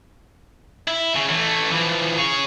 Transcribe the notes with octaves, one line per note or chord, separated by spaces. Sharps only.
E4
C#3
E3 A3
E3 F3
G#4 C#5